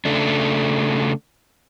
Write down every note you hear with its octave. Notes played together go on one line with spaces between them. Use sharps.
C#3 A3 D4